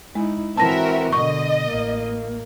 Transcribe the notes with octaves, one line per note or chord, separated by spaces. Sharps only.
G#3 D#4 E4
E3 C4 F#4 A#4 E5 A5 A#6
B2 D3 D#5 C#6
A1 A#3